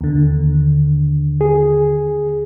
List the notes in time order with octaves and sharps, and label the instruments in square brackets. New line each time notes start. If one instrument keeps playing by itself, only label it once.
[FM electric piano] D#2 D3
[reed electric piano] G#4